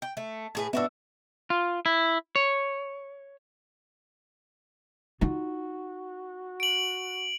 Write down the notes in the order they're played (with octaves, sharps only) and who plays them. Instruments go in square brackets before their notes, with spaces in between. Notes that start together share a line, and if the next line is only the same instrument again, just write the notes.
[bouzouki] G5
A3
A2 G#4 B4
[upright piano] B3 E6 [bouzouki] D4 F#4 E5
[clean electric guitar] F4
E4
C#5
[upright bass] D#4 F4 [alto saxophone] F#4
[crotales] D7 F#7